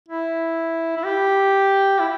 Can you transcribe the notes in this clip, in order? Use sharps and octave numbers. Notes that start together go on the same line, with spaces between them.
E4
E4
G4
E4